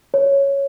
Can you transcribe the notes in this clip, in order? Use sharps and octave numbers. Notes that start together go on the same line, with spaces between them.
C#5